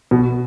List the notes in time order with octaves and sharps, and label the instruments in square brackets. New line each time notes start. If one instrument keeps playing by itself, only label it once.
[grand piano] B2